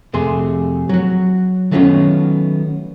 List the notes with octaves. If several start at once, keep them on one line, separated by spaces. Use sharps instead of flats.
F2 C3 A3 G#4 C6
F#3 F#4
D#3 F#3 A3 B3 C#4 F4